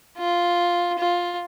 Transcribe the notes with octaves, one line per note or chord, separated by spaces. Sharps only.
F4
F4